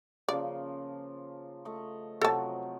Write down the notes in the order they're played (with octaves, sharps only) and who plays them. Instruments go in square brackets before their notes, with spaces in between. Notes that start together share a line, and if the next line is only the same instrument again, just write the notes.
[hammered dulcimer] C#3 F3 A#3 [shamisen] D5
[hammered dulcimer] A3 D#5 C#6
[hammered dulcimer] C3 F3 F#3 [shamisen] A4 A5